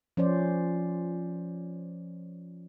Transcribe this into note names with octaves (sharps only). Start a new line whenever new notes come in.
F3 C#4 C5 D5